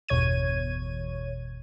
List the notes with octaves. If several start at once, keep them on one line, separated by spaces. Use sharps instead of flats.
G1 E2 B2 C#5 G#6 D#7